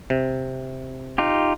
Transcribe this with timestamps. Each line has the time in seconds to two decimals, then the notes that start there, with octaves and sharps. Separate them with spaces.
0.10 C3
1.18 D#4 F4 G4